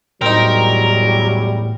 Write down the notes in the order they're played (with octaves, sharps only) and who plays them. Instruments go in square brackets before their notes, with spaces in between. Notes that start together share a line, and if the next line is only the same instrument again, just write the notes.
[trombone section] E2 F#3 G3 [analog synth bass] A2 [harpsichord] C4 D#4 [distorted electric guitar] A#4